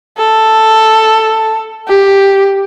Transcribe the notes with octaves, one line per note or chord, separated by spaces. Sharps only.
A4
G4